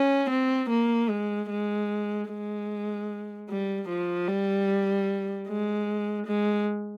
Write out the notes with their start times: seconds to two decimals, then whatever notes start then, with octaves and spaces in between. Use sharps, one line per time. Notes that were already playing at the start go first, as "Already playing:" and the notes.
Already playing: C#4
0.30 C4
0.70 A#3
1.09 G#3
1.50 G#3
2.29 G#3
3.49 G3
3.89 F3
4.28 G3
5.48 G#3
6.27 G#3